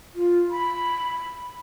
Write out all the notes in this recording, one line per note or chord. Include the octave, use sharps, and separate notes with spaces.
F4
B5